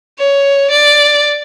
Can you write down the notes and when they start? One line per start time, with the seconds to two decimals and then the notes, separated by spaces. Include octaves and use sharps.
0.19 C#5
0.70 D5